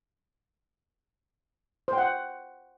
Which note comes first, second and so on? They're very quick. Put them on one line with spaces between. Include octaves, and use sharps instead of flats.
C5 G5 F#5